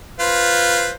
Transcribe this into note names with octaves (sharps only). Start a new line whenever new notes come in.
F4 B4 C5